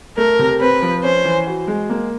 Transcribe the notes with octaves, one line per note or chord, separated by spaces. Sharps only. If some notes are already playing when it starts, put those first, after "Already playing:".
A3 A#4
C3
C4 B4
F3
C#4 C5
E3
F#4
G#3
A#3